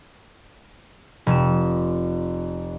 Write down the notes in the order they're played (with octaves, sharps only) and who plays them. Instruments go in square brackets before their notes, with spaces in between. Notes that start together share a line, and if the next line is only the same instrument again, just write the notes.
[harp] F1 E7